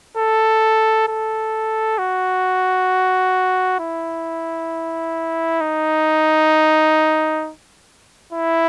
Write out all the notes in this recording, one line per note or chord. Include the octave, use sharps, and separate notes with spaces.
A4
A4
F#4
E4
D#4
E4